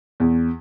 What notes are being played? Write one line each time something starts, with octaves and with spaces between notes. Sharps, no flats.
E2